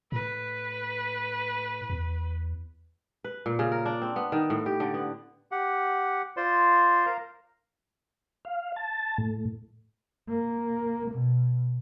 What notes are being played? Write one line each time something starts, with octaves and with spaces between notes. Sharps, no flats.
A2 B4
E2
B4
A#2
C#3
A#4
D4
C4
B3
D#3
A2
G4
D3
B3
G4 F#5
F4 C5 D5 C6
A#4 F5 A#5
F5
A5
A2
A#3
B2